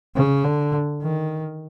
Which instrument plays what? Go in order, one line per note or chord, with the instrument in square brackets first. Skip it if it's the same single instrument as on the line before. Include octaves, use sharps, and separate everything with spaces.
[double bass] C#3
D3
D#3